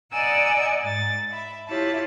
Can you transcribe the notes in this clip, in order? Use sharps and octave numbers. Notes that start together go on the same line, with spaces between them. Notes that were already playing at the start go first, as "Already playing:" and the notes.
D5 D#5 F#5 G#5 A#5 E6
G#2 A6
E5 B5
E4 F4 G4 C#5 A5